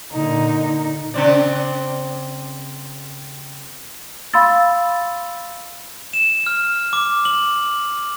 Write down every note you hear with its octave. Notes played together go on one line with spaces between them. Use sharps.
A#2 D3 D#4
C#3 C4 D5
F5 B5 C6 E6 A6
E7
F6
D6
F#7